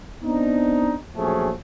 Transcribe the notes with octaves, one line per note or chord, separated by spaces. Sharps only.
B3 C4 D4 D#4
A#1 F3 F#3 A3 C#4 G#4